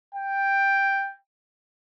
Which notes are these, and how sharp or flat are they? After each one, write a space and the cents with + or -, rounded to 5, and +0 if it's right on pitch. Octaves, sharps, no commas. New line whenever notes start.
G5 +5